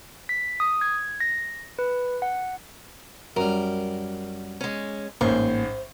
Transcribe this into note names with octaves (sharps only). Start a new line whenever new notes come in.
B6
D#6
G#6
A#6
B4
F#5
F#2 G3 A#4
G#3 C#4
A1 G#2 A#3 C5 C#6